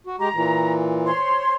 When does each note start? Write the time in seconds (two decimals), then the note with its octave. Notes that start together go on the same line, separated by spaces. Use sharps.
0.07 F#4
0.20 G#3 G4 A#5
0.34 A#2 E3
1.06 C5 C#5 C6